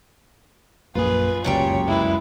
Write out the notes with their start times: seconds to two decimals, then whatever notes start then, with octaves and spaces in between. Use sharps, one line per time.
0.95 A#1 F#2 A#3 F4 G#4 B4
1.44 F1 C#2 F#2 A#2 G3 C#5 G5
1.88 G#3 E4 B4